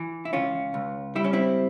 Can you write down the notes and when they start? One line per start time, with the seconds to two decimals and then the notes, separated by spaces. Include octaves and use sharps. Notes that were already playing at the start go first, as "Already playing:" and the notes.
Already playing: E3
0.25 E4
0.33 C#2 C#4 F4
0.74 C#2
1.16 G3 E4
1.24 C#4
1.33 C4 E4